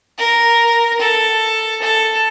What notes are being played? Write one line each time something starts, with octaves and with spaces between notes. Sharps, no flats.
A#4
A4
A4